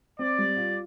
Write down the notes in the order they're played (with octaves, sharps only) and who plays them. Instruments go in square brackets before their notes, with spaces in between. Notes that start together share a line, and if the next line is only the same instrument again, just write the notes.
[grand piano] C4 [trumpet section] D5
[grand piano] G3
F4